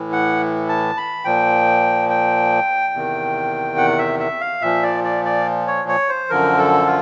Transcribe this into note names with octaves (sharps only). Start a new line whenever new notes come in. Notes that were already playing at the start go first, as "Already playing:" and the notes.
Already playing: A2 E3
F#5
A5
B5
A#2 F3 G5
G5
E2 C3 D#3
F#5
E5
E5
F5
A#2 F3 E5
D5
D5
D5
C#5
C#5
C5
F#2 D3 F3 A#4
A4
F4